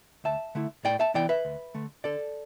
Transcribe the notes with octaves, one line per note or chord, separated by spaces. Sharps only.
D2 E5 A5
D3 A3 E4
A2 D5 G5
E5 A5
E3 B3 E4 D5 G5
B4 E5
D2
D3 A3
D3 A4 D5